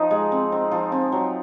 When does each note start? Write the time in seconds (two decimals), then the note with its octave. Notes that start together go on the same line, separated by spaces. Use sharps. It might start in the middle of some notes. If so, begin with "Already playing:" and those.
Already playing: F3 D#4
0.11 G#3
0.32 C4
0.52 C4
0.71 F3
0.92 C4
1.12 F#3